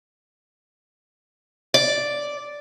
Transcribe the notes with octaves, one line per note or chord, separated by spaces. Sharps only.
D5